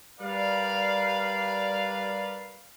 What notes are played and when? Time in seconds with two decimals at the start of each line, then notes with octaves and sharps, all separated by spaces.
0.20 G3 A#4 B4 D5 F5